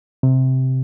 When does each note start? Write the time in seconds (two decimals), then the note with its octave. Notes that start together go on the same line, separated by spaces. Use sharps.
0.23 C3